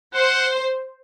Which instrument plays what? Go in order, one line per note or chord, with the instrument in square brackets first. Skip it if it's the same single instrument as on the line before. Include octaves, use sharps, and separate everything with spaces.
[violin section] C5 [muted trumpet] F#5